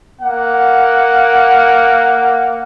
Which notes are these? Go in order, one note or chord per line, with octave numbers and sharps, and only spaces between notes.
A#3 F#5